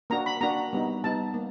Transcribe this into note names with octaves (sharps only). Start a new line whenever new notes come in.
A#3 D4 F#4 A#5
B5
A#3 D4 F#4 A#5
G3 B3 D#4
G3 B3 D#4 A5
A#3